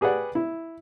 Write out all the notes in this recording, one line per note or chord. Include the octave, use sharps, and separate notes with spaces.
G4 G#4 B4 D5 F#5
E4